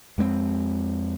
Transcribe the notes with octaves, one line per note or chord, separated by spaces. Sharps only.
F2 G#3 A#3 C4